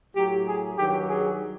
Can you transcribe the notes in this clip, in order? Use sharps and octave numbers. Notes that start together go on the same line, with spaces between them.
A2 F#3 G4
G#4
G2 D#3 F#3 G4
G#4